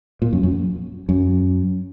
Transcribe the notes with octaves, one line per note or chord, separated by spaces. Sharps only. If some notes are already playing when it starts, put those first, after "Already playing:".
A#2
F#2
F#2
F#2